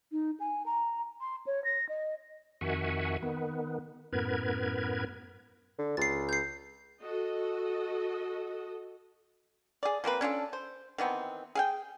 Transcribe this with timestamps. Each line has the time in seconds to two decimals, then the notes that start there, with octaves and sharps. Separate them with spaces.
0.12 D#4
0.40 G#5
0.66 A#5
1.21 C6
1.47 C#5
1.64 A#6
1.89 D#5
2.61 F2 D#3 F#4 E5 F#5 G#5
3.23 D#3 B3
4.13 F#2 A2 B3 A#4 B4 G#6
5.79 D3
5.97 C#2 A6 C7
6.29 G6 C7
7.02 F#4 A4 D#5
9.83 G#4 D5
10.04 F3 A#3 C4 B4
10.21 C#4 D4 F4 A4
10.53 C5
10.98 D#3 E3 B3 C4
11.55 G#4 F5 G5